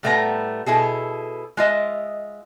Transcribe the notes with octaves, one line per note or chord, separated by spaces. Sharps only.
A2 G3 A3 B3 E4 A#5
B2 E4 G#4 A4
G#3 F4 D#5 E5